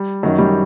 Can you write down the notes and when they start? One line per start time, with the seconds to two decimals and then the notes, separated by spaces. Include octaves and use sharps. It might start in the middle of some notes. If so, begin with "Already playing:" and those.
Already playing: G3
0.23 F#2 D#3 F#3
0.38 G3